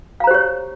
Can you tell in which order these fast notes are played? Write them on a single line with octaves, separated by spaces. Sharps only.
F5 A#5 C5 G4 C#5